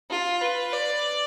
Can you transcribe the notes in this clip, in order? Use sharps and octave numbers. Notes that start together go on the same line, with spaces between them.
F4
B4
D5